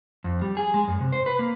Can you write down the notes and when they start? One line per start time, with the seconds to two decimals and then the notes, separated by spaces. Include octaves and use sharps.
0.24 F2
0.42 G3
0.57 G#4
0.74 G#3
0.88 F#2
1.00 C3
1.13 C5
1.26 B4
1.39 A#3